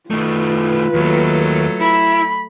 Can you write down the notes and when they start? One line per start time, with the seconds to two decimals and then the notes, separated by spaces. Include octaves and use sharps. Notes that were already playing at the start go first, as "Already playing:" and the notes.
0.11 D#3 A3 F4 B4
0.94 D#2 F#3 A3
1.81 E4 B5